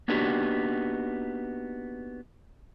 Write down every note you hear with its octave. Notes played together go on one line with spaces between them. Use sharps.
A#3 B3 D4 D#4 F#4 G4